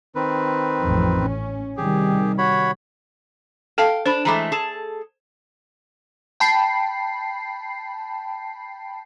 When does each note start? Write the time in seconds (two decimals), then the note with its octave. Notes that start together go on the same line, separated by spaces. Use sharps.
0.15 D#3 C4 B4
0.84 A1 F2
1.27 C#4
1.77 C3 D#3 G3 G4 G#4
2.38 F#4 C#5 B5
3.78 A4 F5 G5 A5
4.06 D4 C5 B5
4.25 E3 G#3 A3 A#5 B5 D6
4.52 G#4 A4 A5
6.40 G5 A5 B5 C7